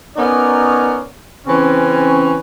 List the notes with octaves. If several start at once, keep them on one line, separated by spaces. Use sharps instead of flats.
B3 C#4 D#4 A#4 C#5 D5
C#3 E3 C4 C#4